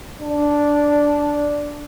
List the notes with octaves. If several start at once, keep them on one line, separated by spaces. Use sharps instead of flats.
D4